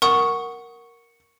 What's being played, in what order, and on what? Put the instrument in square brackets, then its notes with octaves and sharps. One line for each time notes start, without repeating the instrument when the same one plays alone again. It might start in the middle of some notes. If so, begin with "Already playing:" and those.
[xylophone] A#4 F#5 D#6 [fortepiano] C#6